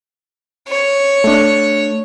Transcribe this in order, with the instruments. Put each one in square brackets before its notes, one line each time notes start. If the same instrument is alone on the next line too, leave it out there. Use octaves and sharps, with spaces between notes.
[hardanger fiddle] C#5
[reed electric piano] A3 D4